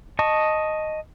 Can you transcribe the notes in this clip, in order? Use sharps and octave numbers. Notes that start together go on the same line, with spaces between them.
D#5 A5 C#6